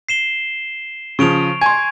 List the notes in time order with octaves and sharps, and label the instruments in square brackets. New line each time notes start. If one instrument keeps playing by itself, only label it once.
[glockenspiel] C7 E7 G7
[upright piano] C#3 F3 [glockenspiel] C#6 D7 F7
[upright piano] G#5 C6 [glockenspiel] G#6